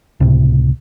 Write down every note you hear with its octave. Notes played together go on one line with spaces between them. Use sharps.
C#2 A2 C3